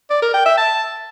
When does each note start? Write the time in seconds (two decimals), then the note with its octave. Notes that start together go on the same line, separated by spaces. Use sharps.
0.10 D5
0.22 A#4
0.34 G5
0.46 E5
0.58 A5